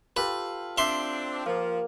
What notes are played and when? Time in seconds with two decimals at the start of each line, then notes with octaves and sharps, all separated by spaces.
0.17 F4 G4 A4 B4
0.78 C4 D4 E5 C6
1.46 F3 A#3